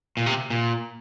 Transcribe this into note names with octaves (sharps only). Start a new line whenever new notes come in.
A#2
C3
A#2